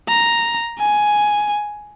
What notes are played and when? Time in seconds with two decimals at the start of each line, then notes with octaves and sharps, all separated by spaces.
0.09 A#5
0.79 G#5